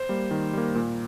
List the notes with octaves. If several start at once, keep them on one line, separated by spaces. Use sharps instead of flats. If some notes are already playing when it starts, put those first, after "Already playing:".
Already playing: C5
G3 A#3
D#3
G3 A#3
A#2